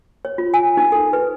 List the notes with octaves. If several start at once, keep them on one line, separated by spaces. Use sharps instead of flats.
C#5
F4
G#5
D#4
A4
B4